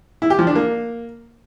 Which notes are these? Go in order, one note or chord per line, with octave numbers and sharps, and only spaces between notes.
E4
G4
F3
D4
A#3